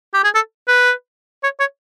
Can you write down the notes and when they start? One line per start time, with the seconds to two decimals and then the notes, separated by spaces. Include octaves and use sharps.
0.14 G4
0.24 G#4
0.35 A4
0.68 B4
1.43 C#5
1.60 C#5